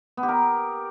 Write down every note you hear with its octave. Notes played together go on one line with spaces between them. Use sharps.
B3
G4
A#4